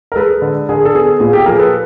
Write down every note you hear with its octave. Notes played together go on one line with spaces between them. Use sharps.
A#4
G#3 A4 B4
D3
D3 G#4 A#4
A4
B3 G#4
A#2 G#4
G4 A4
F3 G#4 A#4
A4 B4